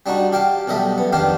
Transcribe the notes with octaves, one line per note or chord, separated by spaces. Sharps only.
G3 D4 D#4 F#4
G4 F5 G5 A5
B1 G3 A4 D#5 E5
B3
F2 D#3 D4 G4 F5